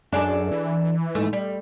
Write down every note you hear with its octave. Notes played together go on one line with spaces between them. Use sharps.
F#2 D4 G#4 A4
E3
G#2 A3
G3